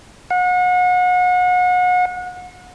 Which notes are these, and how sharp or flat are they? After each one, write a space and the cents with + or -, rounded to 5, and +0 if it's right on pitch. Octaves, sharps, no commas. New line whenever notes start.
F#5 -35